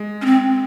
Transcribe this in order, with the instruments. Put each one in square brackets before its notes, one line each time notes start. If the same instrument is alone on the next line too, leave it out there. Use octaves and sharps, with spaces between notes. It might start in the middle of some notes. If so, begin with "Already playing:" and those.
Already playing: [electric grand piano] G#3
[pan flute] C#4
C4